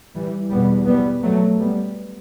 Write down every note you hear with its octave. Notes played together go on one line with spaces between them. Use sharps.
E3 G3
E2 B2 G3 B3
G3 B3
F#3 A3
G3 B3